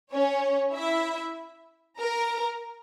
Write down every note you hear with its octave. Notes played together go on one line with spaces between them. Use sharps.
C#4 C#5
E4 E5
A#4 A#5